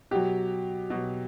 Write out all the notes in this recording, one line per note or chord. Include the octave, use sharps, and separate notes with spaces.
B2 F#3 G4
B2 F#3